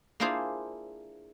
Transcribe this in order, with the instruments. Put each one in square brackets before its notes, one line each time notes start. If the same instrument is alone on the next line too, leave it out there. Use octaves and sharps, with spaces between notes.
[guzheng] A#3 D4 E4 F4 G#4 C5